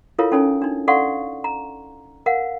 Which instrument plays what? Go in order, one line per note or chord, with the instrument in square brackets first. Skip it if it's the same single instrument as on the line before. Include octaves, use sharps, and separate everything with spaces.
[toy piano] E4 F4 A4 A#4 C#5 F5
C#4 D#4 A4 C#5 G#5
D4 D#4
A4 D5 F5 F#5 C6 C#6
A#5
A#4 F5 F#5